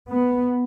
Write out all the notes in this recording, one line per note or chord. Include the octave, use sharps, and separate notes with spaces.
B3